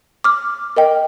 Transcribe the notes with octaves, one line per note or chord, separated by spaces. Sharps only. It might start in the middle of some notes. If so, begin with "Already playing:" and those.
D6 F6
A#4 D#5 G5